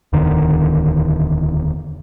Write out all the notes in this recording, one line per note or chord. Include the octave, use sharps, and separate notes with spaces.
D1 E2 D3 D#3